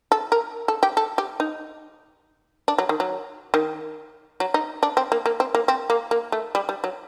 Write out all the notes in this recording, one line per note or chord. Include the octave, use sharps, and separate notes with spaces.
A4
A#4
A4
G4
A4
G4
D#4
D4
F#3
D#3
F#3
D#3
F#3
D#4
D4
C4
A#3
A#3
C4
A#3
C4
A#3
A#3
A3
G3
G3
F#3